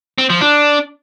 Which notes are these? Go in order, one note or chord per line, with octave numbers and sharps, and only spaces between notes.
C4
F3
D4